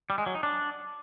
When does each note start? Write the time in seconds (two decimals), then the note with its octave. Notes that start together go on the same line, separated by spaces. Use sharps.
0.10 G3
0.18 G#3
0.26 F#3
0.35 D#4
0.43 D4